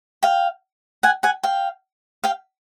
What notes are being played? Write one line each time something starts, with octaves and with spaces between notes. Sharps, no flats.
F5 G5
F#5 G#5
F#5 G#5
F5 G5
F5 G5